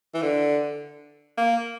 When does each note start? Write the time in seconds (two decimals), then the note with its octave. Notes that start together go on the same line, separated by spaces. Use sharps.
0.14 E3
0.22 D3
1.37 A#3